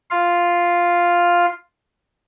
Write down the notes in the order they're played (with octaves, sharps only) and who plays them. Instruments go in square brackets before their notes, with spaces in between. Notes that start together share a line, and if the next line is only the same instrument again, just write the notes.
[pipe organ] F4 F5